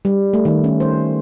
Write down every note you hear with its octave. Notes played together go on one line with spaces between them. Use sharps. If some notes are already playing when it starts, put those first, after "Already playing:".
G3
A3
D#3
C#4
C5